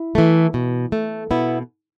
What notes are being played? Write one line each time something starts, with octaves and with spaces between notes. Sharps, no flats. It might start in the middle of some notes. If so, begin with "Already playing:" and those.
Already playing: E4
E3 A3
B2
A3
B2 B3 E4